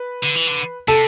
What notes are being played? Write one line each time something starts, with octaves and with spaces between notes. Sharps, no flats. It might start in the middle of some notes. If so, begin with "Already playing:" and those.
Already playing: B4
D3
E3
D3
C3 A4